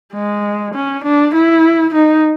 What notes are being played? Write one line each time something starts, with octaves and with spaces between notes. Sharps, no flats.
G#3
C#4
D4
E4
D#4